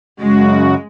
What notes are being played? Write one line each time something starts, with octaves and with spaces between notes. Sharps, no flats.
F#2 C#3 G#3 F#4